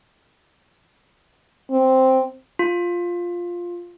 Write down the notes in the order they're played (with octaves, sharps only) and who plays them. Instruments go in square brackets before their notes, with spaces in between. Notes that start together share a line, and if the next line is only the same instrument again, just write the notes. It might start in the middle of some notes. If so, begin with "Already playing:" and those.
[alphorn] C4
[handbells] F4